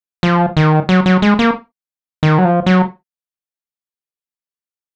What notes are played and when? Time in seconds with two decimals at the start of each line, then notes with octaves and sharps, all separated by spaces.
0.23 F3
0.57 D#3
0.89 F#3
1.06 F#3
1.22 G#3
1.39 A#3
2.23 D#3
2.38 F#3
2.45 F3
2.66 F#3